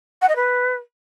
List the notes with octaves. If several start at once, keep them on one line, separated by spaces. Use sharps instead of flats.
F#5
D#5
B4